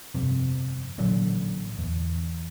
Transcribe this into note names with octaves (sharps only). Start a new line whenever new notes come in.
G1 F2 C3
A1 A#2 D3 F#3
E2